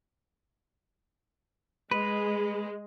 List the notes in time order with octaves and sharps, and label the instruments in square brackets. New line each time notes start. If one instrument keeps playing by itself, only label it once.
[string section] G#3 [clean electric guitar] B4